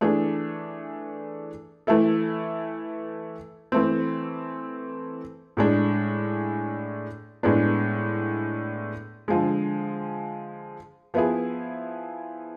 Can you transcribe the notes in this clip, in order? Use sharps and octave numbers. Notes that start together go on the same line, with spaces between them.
E3 A3 D4 G#4
E3 A3 E4 A4
E3 A3 C4
A2 G#3 D4 G#4
A2 G#3 B3 D4
D3 F3 G#3
F3 B3 E4 G#4